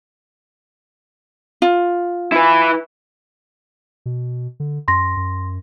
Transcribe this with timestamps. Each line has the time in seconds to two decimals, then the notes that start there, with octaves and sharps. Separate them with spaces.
1.62 F4
2.32 E4 B4
4.06 B2
4.60 D3
4.88 F#2 C6 A#6
5.17 F#2